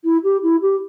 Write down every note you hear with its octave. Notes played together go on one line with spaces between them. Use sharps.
E4
G4
E4
G4